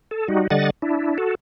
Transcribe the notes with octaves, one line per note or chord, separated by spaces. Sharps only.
A4
G3 D#4 F#4
D3 G3 D#5 F#5 A6
D4 E4
F#4 A4